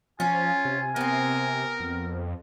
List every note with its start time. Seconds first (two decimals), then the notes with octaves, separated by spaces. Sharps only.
0.20 F3 C#4 F4 G#5
0.65 C3
0.96 B3 C4 A#4
1.80 F2